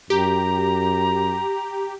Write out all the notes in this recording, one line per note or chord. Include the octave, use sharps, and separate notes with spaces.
F#2 G4 A#5